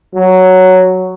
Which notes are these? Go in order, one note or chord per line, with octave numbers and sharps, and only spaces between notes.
F#3